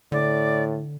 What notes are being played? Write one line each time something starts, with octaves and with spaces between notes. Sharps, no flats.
A2 D3 D5